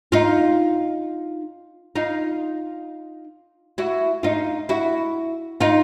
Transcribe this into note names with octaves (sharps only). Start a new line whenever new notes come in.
D#4 F4
D#4 F4
E4 F#4
D#4 F4
E4 F#4
D#4 F4